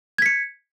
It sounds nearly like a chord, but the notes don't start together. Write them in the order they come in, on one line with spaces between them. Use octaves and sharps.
G#6 B6 C#7